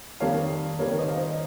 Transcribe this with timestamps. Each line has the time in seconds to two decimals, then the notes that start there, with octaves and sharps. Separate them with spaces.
0.20 F2 D#3 G3 A#3 C#5 F5
0.79 F2 D#3 G3 A#3 A#4 C#5
0.98 C5 D#5
1.08 F5
1.18 C5 D#5